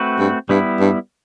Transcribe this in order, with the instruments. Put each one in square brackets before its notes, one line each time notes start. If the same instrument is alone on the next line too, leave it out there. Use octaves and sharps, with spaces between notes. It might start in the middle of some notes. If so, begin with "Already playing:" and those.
Already playing: [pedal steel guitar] A3 C4 F#4 B4
[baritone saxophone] G2
[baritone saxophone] G2 [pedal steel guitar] G3 B3 E4
[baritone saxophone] G2